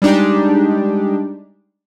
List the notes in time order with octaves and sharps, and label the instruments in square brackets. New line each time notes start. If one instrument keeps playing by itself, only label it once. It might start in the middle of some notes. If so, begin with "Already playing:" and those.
[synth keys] G3 G#3 D4 D#4 G4